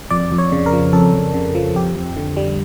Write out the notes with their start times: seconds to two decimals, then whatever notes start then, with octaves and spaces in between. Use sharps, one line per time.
0.10 F2 D5
0.31 F2
0.38 C#5
0.52 C#3
0.66 A#4
0.73 F3
0.93 F2 A4
1.14 F2
1.34 C#3
1.55 F3
1.75 F2 G4
1.96 F2
2.16 D3
2.37 G3